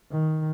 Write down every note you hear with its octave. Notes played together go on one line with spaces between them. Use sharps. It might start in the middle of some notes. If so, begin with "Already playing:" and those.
D#3